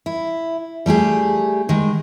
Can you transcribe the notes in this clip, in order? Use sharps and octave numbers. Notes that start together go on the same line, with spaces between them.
E4
G3 A3 G4 G#4
D#3 G#3